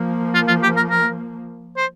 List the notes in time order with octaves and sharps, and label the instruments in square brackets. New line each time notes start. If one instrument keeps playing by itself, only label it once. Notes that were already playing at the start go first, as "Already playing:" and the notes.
Already playing: [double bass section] F3 A#3
[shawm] F4
F4
G4
A#4
A#4
C5